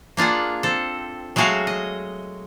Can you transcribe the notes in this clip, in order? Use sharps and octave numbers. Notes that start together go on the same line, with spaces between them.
A#3 D4 F4 G#4 F#5
C4 A4
F#3 G#3 A3 F#4 G#4 F5
D#5